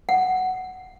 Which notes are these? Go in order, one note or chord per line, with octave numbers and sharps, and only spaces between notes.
F#5